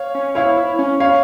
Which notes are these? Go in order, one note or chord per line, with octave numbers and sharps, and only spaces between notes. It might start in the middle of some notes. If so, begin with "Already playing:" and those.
Already playing: C#5 F5
C#4
E4 C#5 F5
E4
C#4
C#5 F5